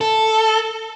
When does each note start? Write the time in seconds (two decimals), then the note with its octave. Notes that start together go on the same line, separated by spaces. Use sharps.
0.01 A4